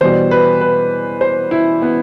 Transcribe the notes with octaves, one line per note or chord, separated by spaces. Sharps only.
E2 B2 G3 C5
B4
B4
C5
E4
B3